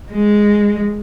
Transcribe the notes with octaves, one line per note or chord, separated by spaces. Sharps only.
G#3